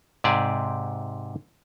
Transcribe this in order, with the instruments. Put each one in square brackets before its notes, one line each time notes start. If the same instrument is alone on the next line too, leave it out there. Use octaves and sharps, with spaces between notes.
[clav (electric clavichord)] G#2 C3 G4 G#4 D5